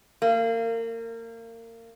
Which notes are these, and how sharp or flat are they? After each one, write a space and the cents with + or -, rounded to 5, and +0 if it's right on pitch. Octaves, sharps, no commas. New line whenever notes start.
A#3 -30